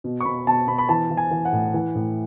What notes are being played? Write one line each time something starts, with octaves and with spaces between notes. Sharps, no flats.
B2
C#6
B2 B5
B2 A5
B2 B5
B5
E3 A5
E3
G#5
E3
F#5
A2
E3
A2